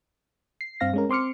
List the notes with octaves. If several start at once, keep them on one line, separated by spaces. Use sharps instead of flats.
C7
G2 C4 F5 A#6
G#3 C#4 A#4
C4 C6 D6 F6 C#7